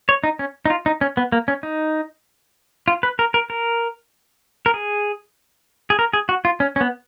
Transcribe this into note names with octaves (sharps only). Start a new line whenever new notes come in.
C#5
D#4
C#4
D#4
F4
D#4
C#4
B3
A#3
C#4
D#4
F4
B4
A#4
A#4
A#4
A#4
G#4
G#4
A#4
G#4
F#4
F4
C#4
C#4
B3